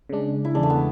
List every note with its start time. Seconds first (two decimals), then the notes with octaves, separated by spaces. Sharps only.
0.09 C#3 G#3 D4
0.45 E4
0.55 E2 C#3 G#3 D4
0.63 A3
0.70 B3